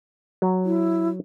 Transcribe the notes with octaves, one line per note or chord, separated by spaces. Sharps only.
F#3
E4